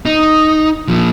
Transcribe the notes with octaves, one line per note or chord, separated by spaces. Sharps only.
D#4
A#2 F3